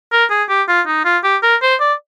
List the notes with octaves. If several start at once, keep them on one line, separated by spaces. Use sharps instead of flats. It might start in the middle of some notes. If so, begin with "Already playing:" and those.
A#4
G#4
G4
F4
D#4
F4
G4
A#4
C5
D5